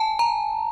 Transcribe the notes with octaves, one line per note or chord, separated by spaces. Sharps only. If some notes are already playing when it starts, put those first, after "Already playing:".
Already playing: G#5 A5
A#5